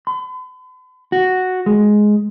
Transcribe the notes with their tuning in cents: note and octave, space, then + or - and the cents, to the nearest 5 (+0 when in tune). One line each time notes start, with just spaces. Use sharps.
B5 +45
F#4 +0
G#3 +10